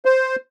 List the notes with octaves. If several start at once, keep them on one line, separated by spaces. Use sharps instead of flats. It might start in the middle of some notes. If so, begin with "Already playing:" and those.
C5